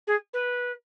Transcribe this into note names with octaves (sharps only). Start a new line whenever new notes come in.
G#4
B4